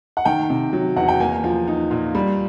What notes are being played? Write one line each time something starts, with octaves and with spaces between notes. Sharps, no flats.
F#5
D#3 G5
C3
F#3
E2 F#5
G5
A#3 G#5
F3
D#4
A#2
G3